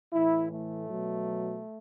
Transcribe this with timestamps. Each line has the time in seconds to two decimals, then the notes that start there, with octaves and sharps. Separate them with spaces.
0.13 A2 E3 E4
0.51 A3
0.89 B2 F#3